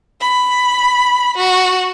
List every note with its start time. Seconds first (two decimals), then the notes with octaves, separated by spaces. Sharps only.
0.20 B5
1.37 F#4